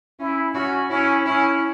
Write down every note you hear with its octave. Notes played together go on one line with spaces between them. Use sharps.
C#4 E4
C#4 F#4
C#4 E4
C#4 E4